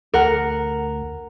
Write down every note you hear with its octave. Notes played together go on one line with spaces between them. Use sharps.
D2 A#4 F#5